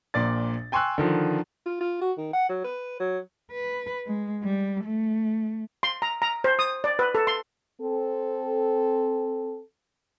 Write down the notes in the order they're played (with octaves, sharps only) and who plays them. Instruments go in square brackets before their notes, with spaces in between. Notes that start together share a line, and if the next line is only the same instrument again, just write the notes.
[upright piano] A#1 A#2 D5 A6
G5 G#5 C6 C#6 E6 F#6
D3 D#3 F3
[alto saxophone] F4
F4
F#4
D#3
F#5
F#3
B4
F#3
[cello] B4
G#3
G3
A3
[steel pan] C6
A#5
A#5
C5
D#6
D5
B4
A4
C6
[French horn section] C4 A4